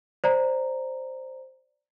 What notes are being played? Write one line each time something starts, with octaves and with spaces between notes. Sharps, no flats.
C5 D5 A#5